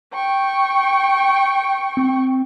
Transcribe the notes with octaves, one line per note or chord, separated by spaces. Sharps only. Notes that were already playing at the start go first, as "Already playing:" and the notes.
G5 C#6
C4